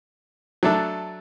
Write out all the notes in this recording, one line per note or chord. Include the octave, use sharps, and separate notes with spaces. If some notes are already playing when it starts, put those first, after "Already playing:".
F#3 A3 D4 A4